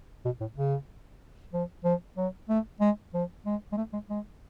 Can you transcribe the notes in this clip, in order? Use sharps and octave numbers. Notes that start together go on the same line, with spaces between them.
B2
A2
C#3
F3
F3
F#3
A3
G#3
F3
G#3
G#3
A3
G#3
G#3